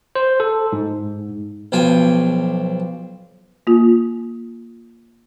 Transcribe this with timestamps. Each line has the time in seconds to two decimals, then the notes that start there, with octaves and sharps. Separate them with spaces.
0.15 C5
0.40 A4
0.72 G#2
1.72 B1 F3 G5 G#5
3.67 A#3 F4